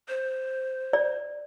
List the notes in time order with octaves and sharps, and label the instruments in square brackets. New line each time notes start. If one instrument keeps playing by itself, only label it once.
[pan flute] C5
[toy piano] D5